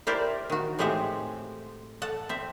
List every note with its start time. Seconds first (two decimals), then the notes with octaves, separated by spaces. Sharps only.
0.07 E4 G4 A#4 C5 D5
0.50 D#3 F#4
0.79 A2 G#3 C4 G4 E5 F#5
2.02 A4 F#5
2.29 C4 E5